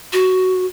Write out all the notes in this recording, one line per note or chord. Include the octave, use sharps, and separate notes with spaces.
F#4